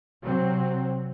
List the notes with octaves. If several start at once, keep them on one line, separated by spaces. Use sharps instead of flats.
C3 F#3 C4